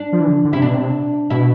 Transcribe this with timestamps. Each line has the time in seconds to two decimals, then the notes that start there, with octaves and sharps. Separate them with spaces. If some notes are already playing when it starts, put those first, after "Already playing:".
Already playing: D4
0.13 F3
0.21 E3
0.28 D3
0.45 D3
0.53 C3 E4
0.62 B2 D4
0.75 C3
1.30 B2 E4